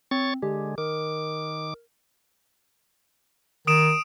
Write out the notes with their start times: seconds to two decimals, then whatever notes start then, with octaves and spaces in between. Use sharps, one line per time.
0.11 C4 C#5 C#6 A6
0.42 D3 G#3 G4
0.78 D#3 A#4 D6
3.67 D#3 D#6 D7 E7